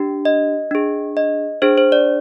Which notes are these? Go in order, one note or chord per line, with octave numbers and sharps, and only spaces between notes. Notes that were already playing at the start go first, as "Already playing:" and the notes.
Already playing: D4 G4
D#5
D4 G#4
D#5
D4 G#4 C5
C5
D5